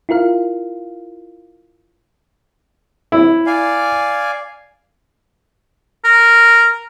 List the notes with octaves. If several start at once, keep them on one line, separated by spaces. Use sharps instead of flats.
E4 F4 A#4 F5
E4
D5 F5 G#5
A#4